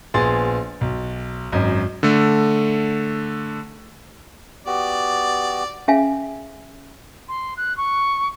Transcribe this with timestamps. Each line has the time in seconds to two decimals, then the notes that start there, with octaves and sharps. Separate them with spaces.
0.14 A#1 B3 G#4 C6 A6
0.81 B1
1.52 G#1 F#2 D#5
2.03 D3 A3
4.66 B3 F#4 G4 D5
5.88 C#4 G#4 E5 F5 G#5
7.29 C6
7.57 F#6
7.77 C#6